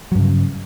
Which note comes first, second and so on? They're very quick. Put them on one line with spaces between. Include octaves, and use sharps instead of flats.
F#3 G2 C#3